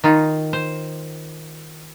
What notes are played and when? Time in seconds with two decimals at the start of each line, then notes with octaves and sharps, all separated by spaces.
0.04 D#3 D#4 F4
0.53 C5